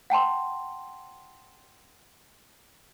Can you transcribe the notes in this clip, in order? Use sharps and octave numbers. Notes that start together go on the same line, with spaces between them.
F#5 G5 A5 C6